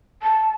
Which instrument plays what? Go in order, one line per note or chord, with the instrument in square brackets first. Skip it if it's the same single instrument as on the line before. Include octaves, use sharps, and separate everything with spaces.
[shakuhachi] A5